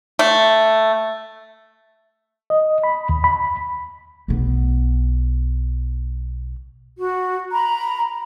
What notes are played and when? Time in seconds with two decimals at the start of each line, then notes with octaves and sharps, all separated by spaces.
0.19 A3
2.50 D#5
2.84 B5
3.09 D#2
3.24 B5
4.28 B1 B3
7.00 F#4
7.52 A#5 B5